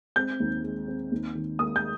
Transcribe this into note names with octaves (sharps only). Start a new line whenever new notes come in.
C4 G6
D#2
G#3
C4
D#2
D#3
A#3 D#6
G6